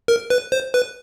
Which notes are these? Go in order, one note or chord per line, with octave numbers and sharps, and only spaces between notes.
A#4
B4
C5
B4